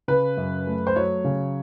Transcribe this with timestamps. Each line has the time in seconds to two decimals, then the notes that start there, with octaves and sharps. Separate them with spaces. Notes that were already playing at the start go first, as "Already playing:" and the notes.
0.08 C#3 B4
0.37 F#2
0.67 A3
0.87 C5
0.96 F#3 C#5
1.24 C#3